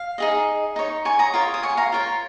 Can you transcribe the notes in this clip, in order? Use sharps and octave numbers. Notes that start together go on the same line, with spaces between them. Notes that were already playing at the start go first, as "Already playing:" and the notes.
Already playing: F5
D#4 G#4 D#5
D#4 C#5
G#5 C#6
A#5 D#6
F4 A#4 C#5
D#6
G#5 C#6
F5 A#5
F4 A#4 C#5